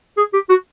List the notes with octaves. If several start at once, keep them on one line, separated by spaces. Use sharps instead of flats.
G#4
G4
F#4